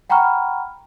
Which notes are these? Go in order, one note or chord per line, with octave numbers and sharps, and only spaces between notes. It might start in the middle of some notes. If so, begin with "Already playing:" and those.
F#5 G5 A#5 B5 C#6 F6